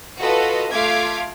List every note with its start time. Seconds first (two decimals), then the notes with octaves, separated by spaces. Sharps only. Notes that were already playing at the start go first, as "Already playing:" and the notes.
0.21 F4 F#4 A4 B4 D#5
0.72 A3 F4 F5 D6 G#6 B6